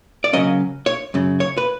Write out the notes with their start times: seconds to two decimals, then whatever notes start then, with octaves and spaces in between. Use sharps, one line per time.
0.24 D5
0.33 C#3 F#3 A#3 C#4 D#5
0.86 C#5
1.14 F#2 C#3
1.40 C#5
1.57 B4